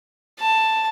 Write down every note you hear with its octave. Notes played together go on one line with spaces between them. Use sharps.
A5